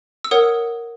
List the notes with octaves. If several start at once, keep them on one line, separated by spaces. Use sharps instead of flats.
E6
A#4 C#5 F#5 D#6